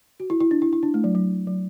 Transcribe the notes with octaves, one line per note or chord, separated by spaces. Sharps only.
F#4
E4
E4
D4
E4
E4
D4
A3
F#3
F#3
F#3